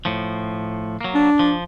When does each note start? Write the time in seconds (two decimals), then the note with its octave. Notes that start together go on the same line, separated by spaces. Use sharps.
0.05 A2 F3
1.01 F#3 A#3
1.15 D4
1.39 F3